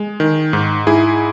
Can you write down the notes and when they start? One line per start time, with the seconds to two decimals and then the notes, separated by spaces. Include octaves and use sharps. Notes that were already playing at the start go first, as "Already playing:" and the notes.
Already playing: G#3
0.20 D#3
0.53 G#2
0.87 G#2 E4 G#4